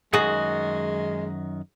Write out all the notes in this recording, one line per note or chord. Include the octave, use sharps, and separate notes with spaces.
F#2 D#3 G#3 F#4 G#4